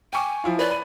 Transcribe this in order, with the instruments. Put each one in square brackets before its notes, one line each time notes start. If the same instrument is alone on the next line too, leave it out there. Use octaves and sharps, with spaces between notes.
[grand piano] G5 C#6 D6 [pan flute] G#5
[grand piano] F3 E4 F4
[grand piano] B4 C#5 [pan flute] D5
[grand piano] B5 D#7